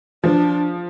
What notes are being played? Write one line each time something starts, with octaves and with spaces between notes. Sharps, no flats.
F3 D4